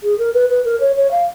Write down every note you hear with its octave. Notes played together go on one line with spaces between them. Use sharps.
G#4
A#4
B4
B4
A#4
C#5
C#5
F5